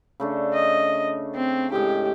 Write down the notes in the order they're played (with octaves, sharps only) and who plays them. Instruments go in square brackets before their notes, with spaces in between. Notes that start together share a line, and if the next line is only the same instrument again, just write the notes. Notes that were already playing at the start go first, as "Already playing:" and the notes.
[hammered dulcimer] C#3 A3 D4
[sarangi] D#5
C4
[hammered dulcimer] A2 G#3 [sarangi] G4